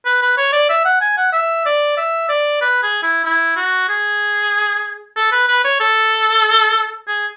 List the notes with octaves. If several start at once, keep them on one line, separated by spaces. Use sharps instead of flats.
B4
B4
C#5
D5
E5
F#5
G#5
F#5
E5
D5
E5
D5
B4
G#4
E4
E4
F#4
G#4
A4
B4
B4
C#5
A4
G#4